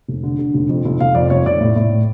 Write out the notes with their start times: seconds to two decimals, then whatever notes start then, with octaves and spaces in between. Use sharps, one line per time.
0.08 F1
0.23 D3
0.39 D3
0.54 F1
0.69 F2
0.85 F1
1.00 F1 F5
1.15 F2 D5
1.30 F1 C#5
1.46 F1 D5
1.61 A2
1.76 A2